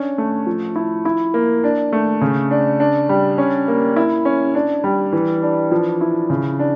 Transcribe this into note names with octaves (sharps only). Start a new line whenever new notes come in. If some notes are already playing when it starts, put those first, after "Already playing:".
Already playing: C#4 D4
A3
F3
E4
E4
A#3
D4
A3
C#3
D4
D4
G3
C#4
A#3
E4
C#4
D4
G3
E3
D4
F3
E4
C#3
D4